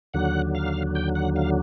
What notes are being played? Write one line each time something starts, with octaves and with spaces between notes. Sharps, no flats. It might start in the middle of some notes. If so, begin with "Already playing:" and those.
D#2 D3 F#3 F#5
F5
G5
F#5
F5